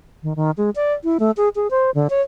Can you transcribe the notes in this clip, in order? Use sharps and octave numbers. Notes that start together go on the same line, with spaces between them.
D#3
D#3
G#3
D5
E4
A3
G#4
G#4
C5
D3
C#5